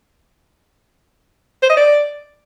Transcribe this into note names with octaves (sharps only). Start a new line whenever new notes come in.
C5
D#5
D5